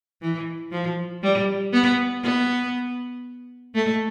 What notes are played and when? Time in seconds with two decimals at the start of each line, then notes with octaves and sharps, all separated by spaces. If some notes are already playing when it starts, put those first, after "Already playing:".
0.22 E3
0.72 F3
1.23 G3
1.73 B3
2.23 B3
3.75 A3